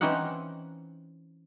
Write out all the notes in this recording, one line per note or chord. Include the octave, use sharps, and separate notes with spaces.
E3 C4 C#4 D#4 F#5